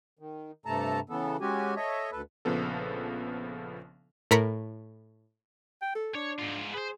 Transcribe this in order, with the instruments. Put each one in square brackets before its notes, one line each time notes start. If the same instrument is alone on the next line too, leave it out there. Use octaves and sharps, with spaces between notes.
[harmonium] D#3
G2 C3 A3 A4 A5 A#5
C#3 E3 B3 A4
G#3 C#4 F#4 G4 G#5
A4 C#5 D#5 E5
D2 A4 B4
[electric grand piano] A#1 C#3 F3 B3 A4
[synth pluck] A2 A#4 B5 B6 C#7
[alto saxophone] G5
A4
[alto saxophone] D4 [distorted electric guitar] C#5
[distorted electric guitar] G#2 F4
[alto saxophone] G#4 [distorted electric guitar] B4 C5